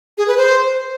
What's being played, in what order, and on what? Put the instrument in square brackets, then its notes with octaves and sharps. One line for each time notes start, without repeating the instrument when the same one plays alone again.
[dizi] G#4
B4
C5